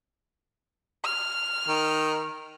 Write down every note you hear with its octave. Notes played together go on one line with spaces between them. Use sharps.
F6
D#3